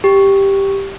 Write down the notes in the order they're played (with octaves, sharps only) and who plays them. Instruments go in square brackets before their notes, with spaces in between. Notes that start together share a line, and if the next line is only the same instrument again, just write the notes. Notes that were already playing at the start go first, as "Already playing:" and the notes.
[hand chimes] G4